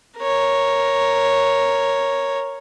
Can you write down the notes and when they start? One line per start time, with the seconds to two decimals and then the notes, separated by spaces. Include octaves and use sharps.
0.18 A#4 C#5